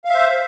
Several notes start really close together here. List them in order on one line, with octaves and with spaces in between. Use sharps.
F5 E5 C5